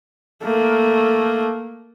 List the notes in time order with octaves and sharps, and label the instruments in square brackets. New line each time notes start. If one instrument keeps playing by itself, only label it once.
[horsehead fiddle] A3 A#3